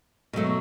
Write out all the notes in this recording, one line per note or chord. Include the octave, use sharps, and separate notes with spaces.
B2 F#3 A3